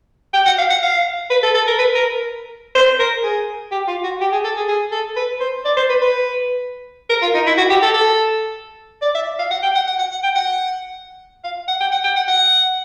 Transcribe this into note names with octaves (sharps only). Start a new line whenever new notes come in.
G5
F#5
F5
F#5
F5
B4
A4
A4
A#4
B4
A#4
C5
A#4
G#4
G4
F4
F#4
G4
G#4
A4
G#4
G#4
A4
B4
C5
D5
C5
B4
B4
A#4
F4
D#4
E4
F#4
G4
A4
A4
D5
E5
F5
F#5
G5
F#5
F#5
F#5
F#5
G5
F#5
F5
F#5
G5
F#5
G5
F#5
F#5